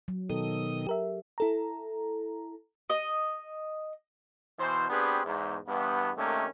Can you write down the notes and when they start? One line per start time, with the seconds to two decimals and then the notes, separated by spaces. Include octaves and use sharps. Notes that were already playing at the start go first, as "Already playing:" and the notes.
0.08 F#3
0.30 B2 D#3 A4 D#6
0.87 G4 A#4 E5
1.38 E4 A4 A#5
2.90 D#5
4.59 B2 E3 C5
4.90 B3 C4 D4 G4 G#4 B4
5.25 E2 G#2
5.68 E2 G2 B3
6.17 C3 D#3 A3 A#3 C#4 D4